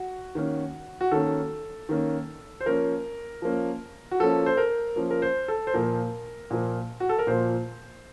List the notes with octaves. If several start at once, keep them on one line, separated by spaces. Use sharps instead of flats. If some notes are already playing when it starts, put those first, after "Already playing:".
Already playing: F#4
D#3 A#3 C#4
F#4
D#3 A#3 C#4 A4
D#3 A#3 C#4
C5
F3 A#3 C#4 A#4
F3 A#3 C#4
F#4
F3 A#3 C#4 A4
C5
A#4
F3 A#3 C#4
A#4
C5
A4
C5
A#2 F3 A#3 A#4
A#2 F3 A#3
F#4
A4
A#4
A#2 F3 A#3 C5